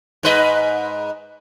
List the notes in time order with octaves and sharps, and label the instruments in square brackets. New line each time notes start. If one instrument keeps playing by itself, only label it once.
[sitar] G#2 B4 D#5